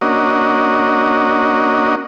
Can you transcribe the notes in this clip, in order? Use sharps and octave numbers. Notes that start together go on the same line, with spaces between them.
A#3 C#4 D4 F#4 D#5